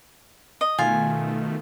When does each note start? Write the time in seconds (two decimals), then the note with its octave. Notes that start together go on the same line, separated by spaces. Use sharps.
0.61 D#5
0.78 B2 D#3 A3 F4 G#5